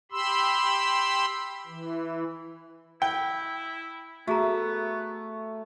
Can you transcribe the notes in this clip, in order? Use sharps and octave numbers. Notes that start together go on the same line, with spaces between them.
G4 B5 C6 E6
E3
E4 G5
A3 B3 F#4 G#4 A#5